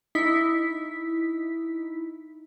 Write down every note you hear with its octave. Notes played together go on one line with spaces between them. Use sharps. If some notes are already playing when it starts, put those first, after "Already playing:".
D#4 E4 B6